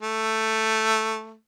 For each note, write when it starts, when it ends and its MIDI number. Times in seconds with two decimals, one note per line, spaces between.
0.02 1.36 57